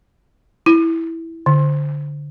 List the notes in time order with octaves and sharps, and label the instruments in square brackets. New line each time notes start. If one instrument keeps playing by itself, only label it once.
[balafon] E4
D3